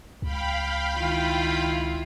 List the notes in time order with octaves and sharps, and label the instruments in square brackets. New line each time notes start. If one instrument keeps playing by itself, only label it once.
[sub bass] C#2 [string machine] F5 G5 B5
[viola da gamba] D#3 E4 F4